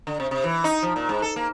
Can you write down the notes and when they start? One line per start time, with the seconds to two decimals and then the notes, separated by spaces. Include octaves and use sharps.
0.07 D3
0.20 C3
0.31 C3
0.44 E3
0.64 D#4
0.83 F3
0.96 A#2
1.09 G#2
1.22 A4
1.36 A#3